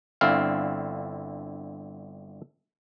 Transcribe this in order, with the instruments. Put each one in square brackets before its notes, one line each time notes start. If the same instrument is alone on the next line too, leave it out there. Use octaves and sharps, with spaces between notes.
[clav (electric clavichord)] G1 D3 C4 E4 F5